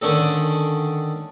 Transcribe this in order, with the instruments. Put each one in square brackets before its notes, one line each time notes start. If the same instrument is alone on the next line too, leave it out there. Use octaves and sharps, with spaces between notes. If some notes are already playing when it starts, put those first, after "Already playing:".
[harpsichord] D3 D#3 C#4 D4 A4